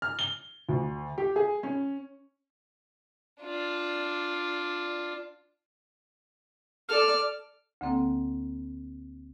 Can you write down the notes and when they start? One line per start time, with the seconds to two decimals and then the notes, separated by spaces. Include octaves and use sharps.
0.02 F6
0.19 G7
0.69 D2
1.18 G4
1.36 G#4
1.63 C#4
3.42 D4 F4
6.89 A4 D5 F6
7.81 D2 D3 A#3 C4 A4 G5